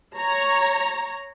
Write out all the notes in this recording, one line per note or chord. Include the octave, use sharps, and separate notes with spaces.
C#5 A#5